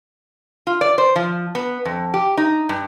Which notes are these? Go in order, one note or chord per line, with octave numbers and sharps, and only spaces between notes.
F4
D5
C5
F3
B3
F2
G4
D#4
G2